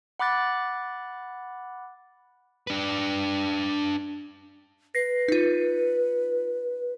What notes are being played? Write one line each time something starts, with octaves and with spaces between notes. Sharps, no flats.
F#5 B5 D6 F#6 A6
D4 B4
B4 A#6 C7
D#4 F4